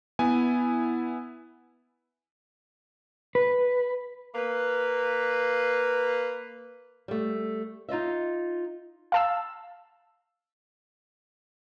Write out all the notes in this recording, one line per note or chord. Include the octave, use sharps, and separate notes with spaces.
B3 E4 G#5
B4
A#3 B4
G3 A3
D#4 F4 D#5 E5
F5 A5 E6